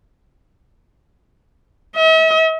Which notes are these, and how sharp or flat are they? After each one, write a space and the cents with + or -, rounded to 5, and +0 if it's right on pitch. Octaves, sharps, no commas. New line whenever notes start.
E5 -45